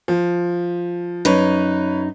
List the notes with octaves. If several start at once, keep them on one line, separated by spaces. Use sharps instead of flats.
F3
F#2 D#4 B4 C#5